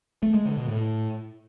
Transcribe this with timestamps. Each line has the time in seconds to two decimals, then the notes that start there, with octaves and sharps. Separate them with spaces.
0.23 A3
0.34 G#3
0.46 D3
0.57 B2
0.68 A2